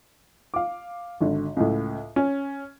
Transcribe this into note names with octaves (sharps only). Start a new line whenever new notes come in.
F5 D6
G#1 D3
C#2 A2
C#4